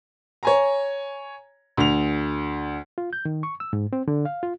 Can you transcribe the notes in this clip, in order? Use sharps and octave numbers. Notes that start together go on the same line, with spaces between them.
C#5 G#5 A#5
D2 F7
F4
G6
D#3
C#6
E6
G#2
C4
D3
F5
F4